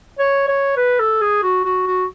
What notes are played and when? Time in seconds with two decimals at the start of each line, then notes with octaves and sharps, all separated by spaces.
0.19 C#5
0.48 C#5
0.77 B4
1.00 A4
1.21 G#4
1.43 F#4
1.65 F#4
1.87 F#4